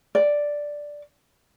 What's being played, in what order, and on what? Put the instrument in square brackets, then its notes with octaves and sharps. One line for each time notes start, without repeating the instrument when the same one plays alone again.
[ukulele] D5